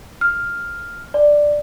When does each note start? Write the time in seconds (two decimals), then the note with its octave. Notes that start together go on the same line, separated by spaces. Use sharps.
0.21 F6
1.14 D5